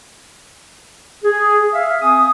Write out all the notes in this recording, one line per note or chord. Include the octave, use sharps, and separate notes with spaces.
G#4
E5 F5
C4 G#5 D#6